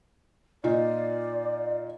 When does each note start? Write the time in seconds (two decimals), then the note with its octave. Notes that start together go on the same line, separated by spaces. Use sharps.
0.64 A#2 D#4 F4 D5